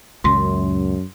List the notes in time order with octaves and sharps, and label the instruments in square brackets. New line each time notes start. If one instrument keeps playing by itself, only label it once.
[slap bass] C#2 A#2 [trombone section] F#2 [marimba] C6